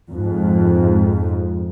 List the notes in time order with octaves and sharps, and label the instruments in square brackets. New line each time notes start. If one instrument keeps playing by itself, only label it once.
[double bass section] F2 G#2